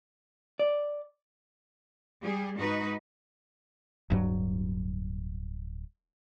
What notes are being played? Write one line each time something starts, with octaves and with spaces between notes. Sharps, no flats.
D5
G3 G#4
G#2 D#4 F#4 B4
D1 G2 F#3